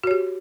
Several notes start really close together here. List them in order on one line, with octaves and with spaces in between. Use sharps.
F#4 C#5 G4